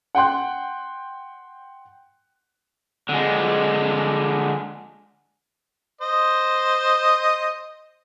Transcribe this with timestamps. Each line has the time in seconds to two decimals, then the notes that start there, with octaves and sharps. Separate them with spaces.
0.15 F#5 G5 C6 F#6
3.09 D3 G#3
6.01 C5 D#5